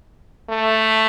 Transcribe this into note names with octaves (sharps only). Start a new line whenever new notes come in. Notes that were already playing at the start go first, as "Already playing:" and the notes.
A3